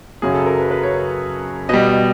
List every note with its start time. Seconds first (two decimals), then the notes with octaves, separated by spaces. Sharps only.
0.22 F#2 C#3 F#3 G#4
0.34 A4
0.46 A#4
0.60 B4
0.71 B4
0.83 C#5
1.69 B2 G3 D#5